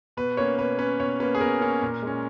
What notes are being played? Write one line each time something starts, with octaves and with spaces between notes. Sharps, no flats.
B2 B4
A#3 C#4 C#5
B2 B4
A#3 C#4 B4
B2 C#5
A#3 C#4 B4
G#4
B2 A#4
A#3 C#4
A#2
G#3 C#4